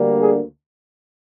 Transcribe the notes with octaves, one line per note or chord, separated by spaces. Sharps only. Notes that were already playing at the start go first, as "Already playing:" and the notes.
Already playing: D2 D3 G3 A#3
G#4